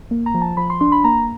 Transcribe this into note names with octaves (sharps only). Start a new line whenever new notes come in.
A#3
A#5
F3
A5
F3 B5
C6
D4 C6
B5
A#3 A#5